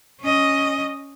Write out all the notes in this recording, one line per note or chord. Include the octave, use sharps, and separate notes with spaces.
C#4 D#5